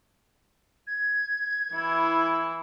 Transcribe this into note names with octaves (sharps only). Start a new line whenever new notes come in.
G#6
E3 E4